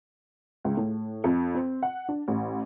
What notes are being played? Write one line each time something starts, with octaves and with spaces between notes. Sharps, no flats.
C#2
A2
F2
C4
F#5
D4
A1